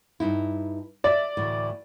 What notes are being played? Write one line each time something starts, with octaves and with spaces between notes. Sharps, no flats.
G2 D#4 E4
D5 E5
D2 A2 E3